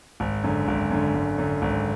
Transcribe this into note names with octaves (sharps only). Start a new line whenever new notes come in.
G#1
F#2 D3
G#1
F#2 D3
G#1
F#2 D3
G#1